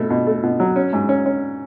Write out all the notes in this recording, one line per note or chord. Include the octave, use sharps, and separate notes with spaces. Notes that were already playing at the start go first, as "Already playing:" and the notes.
Already playing: B2 A3
B2
A3
B2
F#3
C#4
G#2
C#4
C#4